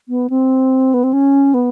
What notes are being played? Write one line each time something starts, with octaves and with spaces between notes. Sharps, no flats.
B3
C4
B3
C4
C#4
B3